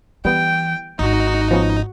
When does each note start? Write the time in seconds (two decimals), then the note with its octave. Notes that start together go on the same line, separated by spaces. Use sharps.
0.25 E3 G3 B3 G5
0.99 G#1 G#2 D#4 F#4
1.51 F3 B3 C#4